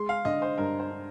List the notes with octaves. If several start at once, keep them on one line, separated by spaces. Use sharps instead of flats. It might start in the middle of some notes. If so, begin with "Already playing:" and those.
Already playing: G#3 C6
F5
D3 D#5
C5
G2 A#4
C5
D4